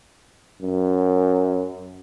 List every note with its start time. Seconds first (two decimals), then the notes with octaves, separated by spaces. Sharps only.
0.61 F#2